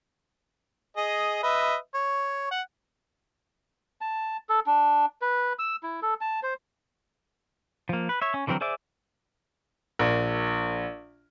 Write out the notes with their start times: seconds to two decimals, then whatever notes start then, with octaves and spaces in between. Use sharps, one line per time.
0.97 G#4 D#5
1.43 B4 D#5 E5
1.94 C#5
2.51 F#5
4.01 A5
4.49 A4
4.67 D4
5.22 B4
5.59 E6
5.83 E4
6.02 A4
6.21 A5
6.43 C5
7.89 F3 A#3
8.09 B4
8.22 C#5 E5
8.34 C#4
8.47 D3 E3 F#3 C4 A#4
8.61 G#4 C5 D5 E5 D6
9.99 A#1